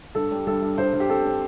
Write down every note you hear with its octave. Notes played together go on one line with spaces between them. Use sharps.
G2 A4
G3
G2 A4
G2
G2 C5
G2
G4
C4 A4
C4